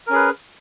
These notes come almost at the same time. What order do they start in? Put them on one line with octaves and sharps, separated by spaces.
A#4 C#4 G#4 B4